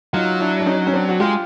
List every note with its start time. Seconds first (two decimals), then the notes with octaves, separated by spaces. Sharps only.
0.13 F#3 D#4 F4
0.40 D4 E4
0.60 D4
0.66 C#4 D#4
0.87 C#4
0.93 C4 D4
1.09 F#4
1.20 G#3 F4 G4